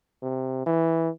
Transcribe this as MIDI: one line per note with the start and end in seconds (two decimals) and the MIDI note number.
0.22 0.61 48
0.66 1.10 52